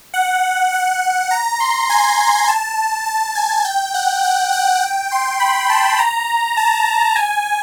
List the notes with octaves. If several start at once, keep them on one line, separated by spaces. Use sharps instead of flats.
F#5
F#5
A#5
C6
G#5
A5
A5
G#5
G5
F#5
F#5
F#5
G5
C6
B5
A5
A#5
A5
G#5